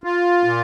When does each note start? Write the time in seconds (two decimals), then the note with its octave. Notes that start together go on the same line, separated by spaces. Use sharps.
0.04 F4
0.44 A#2